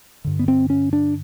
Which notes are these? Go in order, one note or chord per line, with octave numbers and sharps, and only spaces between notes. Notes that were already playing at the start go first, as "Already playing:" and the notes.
G2 D3
B3
C4
C#4
D4